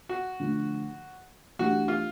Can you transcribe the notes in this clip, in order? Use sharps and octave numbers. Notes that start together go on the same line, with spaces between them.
F#4
D3 F3 A3
E3 A3 D4 F#4 G4
F4